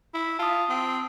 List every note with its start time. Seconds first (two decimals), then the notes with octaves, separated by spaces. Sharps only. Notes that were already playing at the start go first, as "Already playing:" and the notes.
0.14 E4
0.39 F4 A5 D#6
0.69 C4